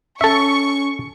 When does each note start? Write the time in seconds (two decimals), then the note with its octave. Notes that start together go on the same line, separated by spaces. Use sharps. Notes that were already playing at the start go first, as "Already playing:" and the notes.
0.21 C#4 A4 E5 C#6